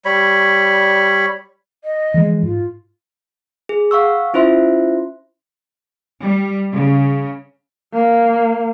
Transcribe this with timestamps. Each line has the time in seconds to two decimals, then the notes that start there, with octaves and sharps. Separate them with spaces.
0.05 G3 C#5 B5
1.84 D#5
2.14 E3 F3 G#3
2.43 G#2 F4
3.69 G#4
3.91 F5 F#5 C#6 E6
4.34 C#4 E4 F4 C5 E5 C6
6.21 G3
6.72 C#3
7.93 A#3